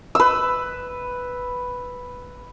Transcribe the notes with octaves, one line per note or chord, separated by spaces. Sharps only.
B4 E6